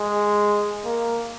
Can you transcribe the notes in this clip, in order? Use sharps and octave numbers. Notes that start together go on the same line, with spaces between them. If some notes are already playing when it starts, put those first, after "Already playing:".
Already playing: G#3
A#3